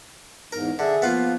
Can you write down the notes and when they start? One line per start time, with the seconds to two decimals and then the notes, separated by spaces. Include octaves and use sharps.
0.53 E2 G#2 A#4
0.79 D3 G#4 E5
1.02 F3 A#3 B3 F4